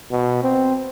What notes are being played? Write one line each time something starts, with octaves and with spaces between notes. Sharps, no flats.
B2
C4